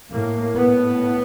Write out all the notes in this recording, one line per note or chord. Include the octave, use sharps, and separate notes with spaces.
A2 A#3
B3